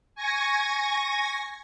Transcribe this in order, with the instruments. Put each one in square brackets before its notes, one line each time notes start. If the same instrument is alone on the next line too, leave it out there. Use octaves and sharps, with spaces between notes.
[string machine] G#5 C#6 G#6 A#6